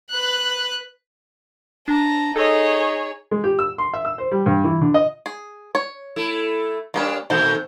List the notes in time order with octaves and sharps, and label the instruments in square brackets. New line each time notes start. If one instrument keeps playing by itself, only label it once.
[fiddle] B4 F#6
[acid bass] D4 [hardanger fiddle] A5 A#5
[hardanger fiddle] D#4 D#5 [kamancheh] G#4 C#5 [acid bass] A4
[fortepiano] G#3
G4
E6
C6
E5
E6
C5
G3
G2
E3
D3
D#5
[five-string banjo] G#4
C#5
[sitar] A3 E4
[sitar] G3 C#4 D4 [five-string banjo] A#3 G4 B4
[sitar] A#2 D#3 A3 [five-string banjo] C4 A4 F#5 [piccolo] G6